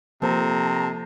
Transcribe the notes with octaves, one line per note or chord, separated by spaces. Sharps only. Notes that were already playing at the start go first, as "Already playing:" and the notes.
C3 F3 A#3 A4 C5 A5 A#5